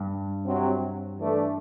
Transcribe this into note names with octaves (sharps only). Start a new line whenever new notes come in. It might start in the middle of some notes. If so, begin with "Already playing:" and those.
Already playing: G2
C3 F#3 C4
E3 A3 D4